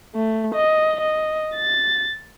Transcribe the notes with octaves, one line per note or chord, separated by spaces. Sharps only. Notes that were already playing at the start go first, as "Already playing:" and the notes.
A3
D#5
D#5
A6